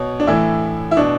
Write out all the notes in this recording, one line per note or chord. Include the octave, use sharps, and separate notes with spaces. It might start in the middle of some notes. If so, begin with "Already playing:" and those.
Already playing: B2 C#5
D4
A2 E3 E4
E4
B2 D4